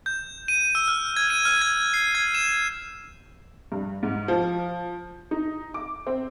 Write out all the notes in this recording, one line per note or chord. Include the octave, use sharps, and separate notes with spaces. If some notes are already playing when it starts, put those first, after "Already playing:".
G6
D#7
E6
F6
G#6
D#7
F6
G#6
C7
G#6
E7
G2
G#2
F3
D#4
D6
C4